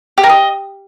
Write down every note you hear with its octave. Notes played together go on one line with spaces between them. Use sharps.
G4
A#4
D#5